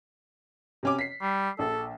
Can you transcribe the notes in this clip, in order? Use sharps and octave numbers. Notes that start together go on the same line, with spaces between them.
C3 C#4 D6
B6 C7
G3
A#1 A4